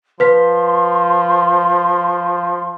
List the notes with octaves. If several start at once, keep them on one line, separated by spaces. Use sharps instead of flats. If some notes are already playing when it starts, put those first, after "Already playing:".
F3 B4 C6 B6